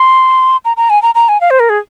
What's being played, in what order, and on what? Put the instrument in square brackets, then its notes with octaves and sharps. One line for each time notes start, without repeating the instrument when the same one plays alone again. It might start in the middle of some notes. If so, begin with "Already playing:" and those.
Already playing: [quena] C6
A#5
A#5
G#5
A#5
A#5
G#5
F5
C5
A#4
G#4